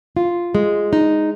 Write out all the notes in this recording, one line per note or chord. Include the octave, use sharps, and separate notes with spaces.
F4
G#3
D#4